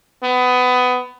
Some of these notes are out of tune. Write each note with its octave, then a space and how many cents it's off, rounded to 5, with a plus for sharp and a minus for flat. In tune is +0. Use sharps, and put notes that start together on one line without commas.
B3 +20